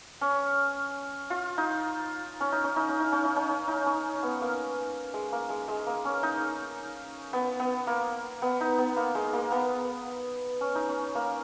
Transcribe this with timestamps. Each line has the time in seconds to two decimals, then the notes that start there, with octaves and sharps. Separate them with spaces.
0.21 C#4
1.30 F4
1.58 D#4
2.40 C#4
2.52 D#4
2.64 C#4
2.76 D#4
2.89 C#4
3.00 D#4
3.12 C#4
3.24 D#4
3.36 C#4
3.49 C#4
3.68 D#4
3.86 C#4
4.23 B3
4.41 A#3
5.14 G#3
5.32 A#3
5.50 G#3
5.68 G#3
5.87 A#3
6.05 C#4
6.23 D#4
7.33 B3
7.60 B3
7.87 A#3
8.42 B3
8.61 D#4
8.78 B3
8.97 A#3
9.15 G#3
9.33 A#3
9.52 B3
10.61 C#4
10.75 D#4
10.88 C#4
11.15 A#3